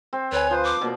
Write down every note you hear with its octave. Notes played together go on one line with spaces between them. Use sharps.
C4
D2 B4 C#5 G#5
F3 B4 C5
D6
B2 A#3 D5